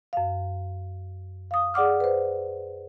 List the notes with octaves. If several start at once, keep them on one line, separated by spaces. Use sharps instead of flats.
F#2 F5
F5 D#6
G#4 D5 F#5 D6 F6
B4 C5